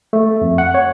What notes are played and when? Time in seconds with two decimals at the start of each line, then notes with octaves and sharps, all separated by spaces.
0.13 A3
0.41 F2
0.58 F#5
0.74 C#5